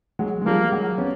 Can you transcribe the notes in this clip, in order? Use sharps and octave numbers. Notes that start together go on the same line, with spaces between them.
F#3 G#3
G#3
F3 G3 A#3
F#3 G#3
B3 C#4